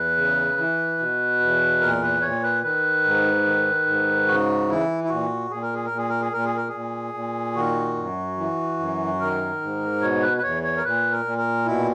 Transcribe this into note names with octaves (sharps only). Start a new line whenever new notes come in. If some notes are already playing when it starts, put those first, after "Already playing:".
Already playing: E2 B4
C#3
E3
B2
E2
A#2 A#4
B4
A#2 C#5
B4
D#3 B4
G#2
D#3
G#2
C#3 F#4
E3 E4
E4
A#2 F#4
A#2 G#4
A#4
G#4
A#4
A#2
G#4
A#4
G#4
A#2 A#4
G#4
A#4
A#2 G#4
A#2
D#3 F#4
F#2
E3
F#2
D#3 A#4
G#2
B2 C#5
B4
B4
E2 C#5
C#5
A#4
A#2 B4
A#4
A#2
A#4
B2 E4